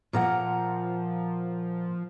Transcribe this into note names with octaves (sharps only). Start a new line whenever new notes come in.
A#2 F3 A#4 F#5